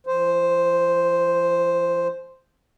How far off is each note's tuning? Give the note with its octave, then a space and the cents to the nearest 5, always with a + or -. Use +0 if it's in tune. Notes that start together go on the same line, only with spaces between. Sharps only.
F3 -45 C5 +0